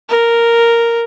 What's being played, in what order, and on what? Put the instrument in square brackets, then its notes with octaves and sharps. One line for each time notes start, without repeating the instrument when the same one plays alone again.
[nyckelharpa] A#4